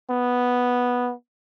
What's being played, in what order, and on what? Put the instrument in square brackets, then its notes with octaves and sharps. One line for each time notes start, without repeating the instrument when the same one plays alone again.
[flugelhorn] B3